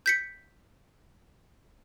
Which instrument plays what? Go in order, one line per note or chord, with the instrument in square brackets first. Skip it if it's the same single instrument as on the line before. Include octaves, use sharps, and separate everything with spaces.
[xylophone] G6 B6 C#7